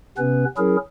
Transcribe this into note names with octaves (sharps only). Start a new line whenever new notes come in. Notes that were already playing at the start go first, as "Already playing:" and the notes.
C3 B3 C#4 B4
F#3 C#4 E4 G#4 A#4